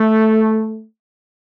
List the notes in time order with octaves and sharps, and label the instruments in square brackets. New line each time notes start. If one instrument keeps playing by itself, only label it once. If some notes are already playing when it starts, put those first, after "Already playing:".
Already playing: [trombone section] A3